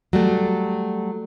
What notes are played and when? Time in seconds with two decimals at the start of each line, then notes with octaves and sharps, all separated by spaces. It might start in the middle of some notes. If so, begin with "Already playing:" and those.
0.13 F#3 G3 A3